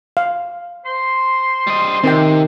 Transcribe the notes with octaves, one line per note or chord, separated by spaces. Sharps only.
F5
C5 C6
G3 D#5
C3 D#3 C4 G5